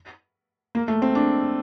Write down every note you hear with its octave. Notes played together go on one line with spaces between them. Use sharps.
A#3
A3
C4
D4